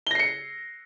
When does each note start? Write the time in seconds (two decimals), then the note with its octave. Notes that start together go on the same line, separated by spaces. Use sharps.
0.07 G7
0.11 A#6
0.15 C7
0.19 C#7